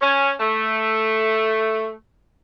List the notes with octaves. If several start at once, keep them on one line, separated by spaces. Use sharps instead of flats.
C#4
A3